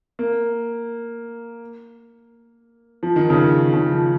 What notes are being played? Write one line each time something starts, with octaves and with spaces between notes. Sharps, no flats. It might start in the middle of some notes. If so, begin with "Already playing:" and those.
A#3
F3
D#3
C#3
D#3
C#3
F3